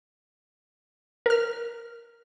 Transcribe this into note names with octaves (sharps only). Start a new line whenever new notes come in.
A#4 F6